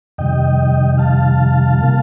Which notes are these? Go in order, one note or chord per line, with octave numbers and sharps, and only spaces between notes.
F2 C3 D#3 G3 D#5 G5
F5 A5
C3 G3 A#3